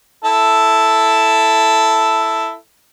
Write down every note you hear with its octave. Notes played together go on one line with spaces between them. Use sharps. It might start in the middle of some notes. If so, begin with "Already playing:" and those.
E4 A4